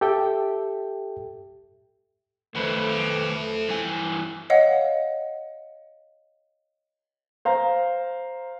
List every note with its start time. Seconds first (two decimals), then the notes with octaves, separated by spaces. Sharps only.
0.01 G4 A4 E5 G5
2.55 F2 D#3 A3 B4 C5
2.89 F3 C4
3.69 G2 E3 G#5
4.50 C#5 D#5 F5 F#5
7.45 C5 F5 A#5